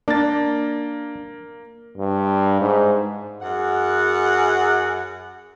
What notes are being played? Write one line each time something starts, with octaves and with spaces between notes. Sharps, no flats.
A#3 D4 A6
G2
G#2
F#2 G#4 F#5